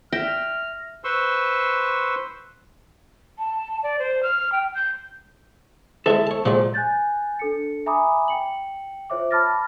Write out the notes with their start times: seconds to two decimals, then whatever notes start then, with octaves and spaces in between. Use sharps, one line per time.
0.13 E5 G5 F6 A#6
1.04 B4 C5 C6 C#6 E6
3.39 A5
3.83 D5
3.99 C5
4.23 F6
4.52 G5
4.75 G6
6.06 E3 G#3 A4 E5
6.27 C#5 A5
6.45 A#2 F3 F#3 G#3
6.74 G#5 F#6 G6 A6
7.39 D4 A4 C#7
7.86 E5 G#5 A#5 B5 D6 D#6
8.28 G5 C#7 F#7
9.10 F4 C5 C#5 E5 D6
9.31 A5 B5 D6 F6 A6 A#6